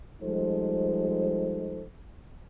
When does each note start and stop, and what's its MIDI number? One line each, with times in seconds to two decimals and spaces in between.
0.22 1.83 53
0.22 1.83 55
0.22 1.83 56
0.22 1.83 63
0.22 1.83 69
0.22 1.83 72